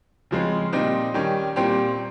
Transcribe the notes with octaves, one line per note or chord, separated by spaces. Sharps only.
C#3 F3 G#3 C4
A#2 G3 C4 D#4
D#3 G3 C#4 G4
A#2 G3 C4 G4